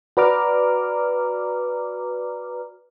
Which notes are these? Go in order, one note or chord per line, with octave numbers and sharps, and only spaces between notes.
F#4 B4 D5 A#5 D6 F6